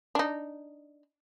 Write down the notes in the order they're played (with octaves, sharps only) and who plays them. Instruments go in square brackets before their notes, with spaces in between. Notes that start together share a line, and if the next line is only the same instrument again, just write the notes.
[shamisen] D4 D#4